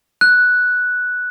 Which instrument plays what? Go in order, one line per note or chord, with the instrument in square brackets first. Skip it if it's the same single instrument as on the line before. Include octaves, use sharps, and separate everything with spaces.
[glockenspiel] F#6